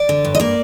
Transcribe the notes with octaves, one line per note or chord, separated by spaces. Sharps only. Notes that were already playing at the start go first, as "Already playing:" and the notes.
Already playing: D5
D3
G2
D#5
A#3 D5